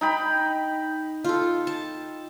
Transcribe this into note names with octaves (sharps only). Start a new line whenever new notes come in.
D#4 G5 B5
F4 A4
A5